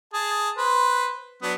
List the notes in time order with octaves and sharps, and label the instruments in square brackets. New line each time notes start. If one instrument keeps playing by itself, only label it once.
[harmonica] G#4 A5
B4 C5
F#3 B3 D4